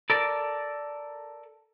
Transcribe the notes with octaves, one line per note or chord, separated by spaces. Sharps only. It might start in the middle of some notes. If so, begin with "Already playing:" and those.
A4 A#4 D5